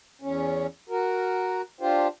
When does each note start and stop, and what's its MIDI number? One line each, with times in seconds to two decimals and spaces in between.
0.22 0.66 40
0.22 0.66 61
0.90 1.61 66
0.90 1.61 70
1.81 2.07 62
1.81 2.07 65
1.81 2.07 67
1.81 2.07 72